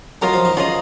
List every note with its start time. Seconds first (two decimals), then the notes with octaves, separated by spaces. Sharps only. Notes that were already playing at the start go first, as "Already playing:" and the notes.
0.22 F#3 F4 A#4 D#5
0.33 F3
0.45 D#3
0.57 C#3 F4 A#4 D#5